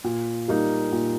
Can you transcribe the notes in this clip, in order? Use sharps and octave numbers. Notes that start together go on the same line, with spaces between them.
A#2
G3 A#3 D#4
A#2